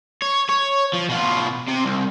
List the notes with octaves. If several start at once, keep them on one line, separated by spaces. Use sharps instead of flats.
C#5
C#5
F3
B2 F4
C3
C2